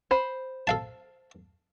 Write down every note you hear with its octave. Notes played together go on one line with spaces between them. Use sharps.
C5 B5
A4 F5 A5